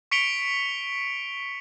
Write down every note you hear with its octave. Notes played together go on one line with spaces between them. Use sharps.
C#6 B6 C#7 D7 F7 G7